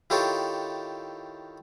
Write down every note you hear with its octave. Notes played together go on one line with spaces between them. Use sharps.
D#3 E4 F4 G4 A4 C#5